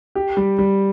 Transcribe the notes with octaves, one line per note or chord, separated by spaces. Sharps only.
G4
G3
G3